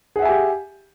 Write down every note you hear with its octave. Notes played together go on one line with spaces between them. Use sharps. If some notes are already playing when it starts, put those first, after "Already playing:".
G4 G#4 E5 F#5 G#5